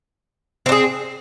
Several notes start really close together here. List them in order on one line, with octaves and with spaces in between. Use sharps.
C4 D4 G#4